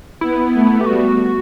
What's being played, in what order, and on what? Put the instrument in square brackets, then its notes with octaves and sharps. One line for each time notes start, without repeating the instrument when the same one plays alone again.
[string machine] B3 [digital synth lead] E4
[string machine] A3
[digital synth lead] G4
[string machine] G3 [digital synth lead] F#4